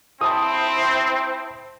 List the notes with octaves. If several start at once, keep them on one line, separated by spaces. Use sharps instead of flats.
C4 E4 C5 A5 D#6